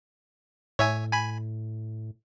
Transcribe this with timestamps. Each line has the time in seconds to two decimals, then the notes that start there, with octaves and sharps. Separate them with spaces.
0.79 A2 C#5 E5 G#5
1.12 G#5 B5